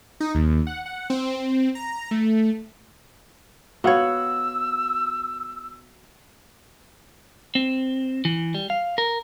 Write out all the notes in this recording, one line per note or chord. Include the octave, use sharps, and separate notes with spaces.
D#4
D#2
F#5
F#5
C4
C4
A#5
A3
B3 F#4 C#5 F5 F#5 E6
C4
E3
G3
F5
A#4